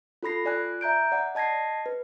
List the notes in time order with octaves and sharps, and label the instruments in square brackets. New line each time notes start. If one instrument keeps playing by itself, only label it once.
[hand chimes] F4 A4 B5 A#6 C7
F4 D5 G#5 F#6
E5 A#5 G6 D7
D5 F#5
D#5 A5 G#6 A#6 C7
B4